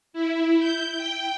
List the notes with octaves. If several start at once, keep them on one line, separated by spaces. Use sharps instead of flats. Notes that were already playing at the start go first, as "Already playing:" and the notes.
E4
G6
G5